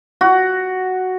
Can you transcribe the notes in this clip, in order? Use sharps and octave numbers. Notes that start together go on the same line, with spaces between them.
F#4